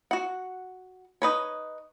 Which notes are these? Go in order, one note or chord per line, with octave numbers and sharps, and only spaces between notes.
F#4 F#5
D#4 B4 C#5